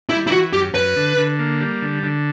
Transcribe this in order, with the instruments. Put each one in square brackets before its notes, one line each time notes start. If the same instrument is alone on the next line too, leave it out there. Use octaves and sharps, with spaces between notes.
[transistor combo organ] G3 [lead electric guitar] E4
[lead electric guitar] E4
[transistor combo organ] E3 [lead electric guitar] F#4
[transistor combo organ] F#2 [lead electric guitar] G4
[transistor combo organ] F#2 [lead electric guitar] B4
[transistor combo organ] D3
D3
A#3
G3
D3
D3